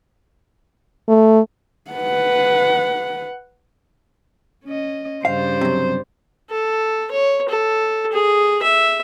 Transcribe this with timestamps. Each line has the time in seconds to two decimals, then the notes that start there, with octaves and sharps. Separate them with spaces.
1.08 A3
1.91 B4 F#5
4.65 C#4 D#5
5.25 G2 C#3 G3 C5 F5
5.61 C3 F#3
6.50 A4
7.11 C#5
7.49 A4
8.13 G#4
8.63 E5